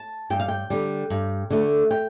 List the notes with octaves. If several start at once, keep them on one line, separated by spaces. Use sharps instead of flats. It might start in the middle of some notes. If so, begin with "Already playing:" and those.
Already playing: A5
G2 G5
F5
G5
D3 G3
G2
D3 A3
G5